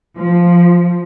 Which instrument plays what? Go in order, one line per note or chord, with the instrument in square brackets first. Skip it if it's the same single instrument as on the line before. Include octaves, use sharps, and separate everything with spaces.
[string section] F3